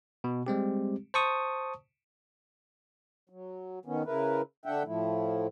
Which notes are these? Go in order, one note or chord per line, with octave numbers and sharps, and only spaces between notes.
B2
G3 G#3 C4 G4
C5 A5 C#6 D#6
F#3
D#3 B3 C#4
C#3 E4 A#4 B4
D3 D4 E5 F#5 G5
A2 F3 A3 E4